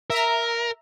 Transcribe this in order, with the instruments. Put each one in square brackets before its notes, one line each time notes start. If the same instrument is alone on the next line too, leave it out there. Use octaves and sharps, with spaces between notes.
[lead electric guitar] A#4 [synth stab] E5 A#5